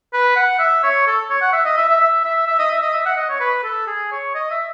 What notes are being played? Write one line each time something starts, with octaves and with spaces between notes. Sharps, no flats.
B4
F#5
E5
C#5
A4
C#5
F#5
E5
D#5
E5
E5
E5
E5
E5
D#5
E5
D#5
E5
F#5
D#5
C#5
B4
A4
G#4
C#5
D#5
E5